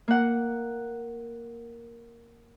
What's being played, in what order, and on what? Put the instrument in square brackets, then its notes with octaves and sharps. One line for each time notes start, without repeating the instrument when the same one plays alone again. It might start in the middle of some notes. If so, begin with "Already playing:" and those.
[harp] A#3 F#5